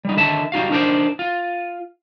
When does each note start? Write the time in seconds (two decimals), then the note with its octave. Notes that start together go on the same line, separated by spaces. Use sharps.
0.05 G3 D#4
0.16 D3 D#3 E5 A5
0.52 G3 D#4 F#4 F5
0.71 D4 D#4 A#4 C5 D5
1.19 F4